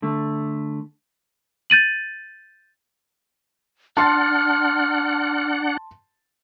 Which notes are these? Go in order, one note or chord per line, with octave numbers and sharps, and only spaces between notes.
D3 A3
G6 A6 D#7 F#7
D4 F#5 A5 C6 F6 A6